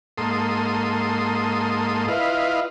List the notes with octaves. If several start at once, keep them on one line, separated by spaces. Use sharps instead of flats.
G#2 A#3 A4 C6 D#6
E4 F4 B4 D#5 F5